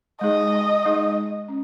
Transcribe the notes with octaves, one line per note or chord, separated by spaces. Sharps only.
G#3 D#4 G#4 D#5
G#3 D#4 G#4
C#4